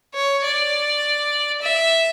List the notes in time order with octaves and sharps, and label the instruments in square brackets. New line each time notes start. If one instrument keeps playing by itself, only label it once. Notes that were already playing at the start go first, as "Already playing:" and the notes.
[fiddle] C#5
D5
E5